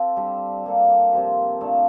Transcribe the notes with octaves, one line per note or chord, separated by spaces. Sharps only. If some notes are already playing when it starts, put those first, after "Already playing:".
Already playing: C4 F4 A4
G3 D4 G4
G3 A#3 D4 A4
C3 F3 C4 G4
A#2 A3 D4